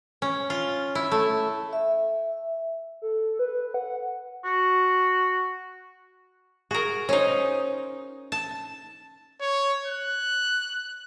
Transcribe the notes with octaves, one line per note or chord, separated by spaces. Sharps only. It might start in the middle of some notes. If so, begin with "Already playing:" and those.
C#4
F4
E4
A3
E5
A4
B4
F#5
F#4
F#4 G#4 A#4
C#4 D#4 C5 C#5
A5
C#5
F#6